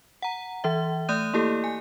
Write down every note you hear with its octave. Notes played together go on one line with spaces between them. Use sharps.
F#5 A#5
E3 E5
A3 D5 D#6 F#6 G6 D#7
A#3 E4 G4 A4
G#5